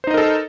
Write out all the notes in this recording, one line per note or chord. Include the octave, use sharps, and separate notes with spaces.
D#4 A4 A#4 C5 D#5